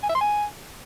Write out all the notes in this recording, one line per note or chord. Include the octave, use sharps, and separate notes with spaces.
G#5
E5
C6
G#5